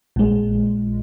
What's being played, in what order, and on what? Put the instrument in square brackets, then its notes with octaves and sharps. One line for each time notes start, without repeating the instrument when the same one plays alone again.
[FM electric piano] A#1 A#2 G#3